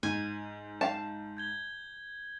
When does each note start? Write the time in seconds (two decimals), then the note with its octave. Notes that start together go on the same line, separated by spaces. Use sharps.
0.03 G#2 G#5 G6
0.81 F5 A5
1.37 G6 G#6 G7